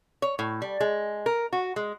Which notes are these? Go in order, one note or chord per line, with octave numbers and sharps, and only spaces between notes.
C#5
A2
G3
G#3
A#4
F#4
G#3